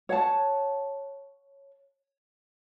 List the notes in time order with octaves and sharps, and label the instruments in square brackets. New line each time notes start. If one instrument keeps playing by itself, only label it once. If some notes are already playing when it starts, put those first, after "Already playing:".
[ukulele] C#5 F#5 A5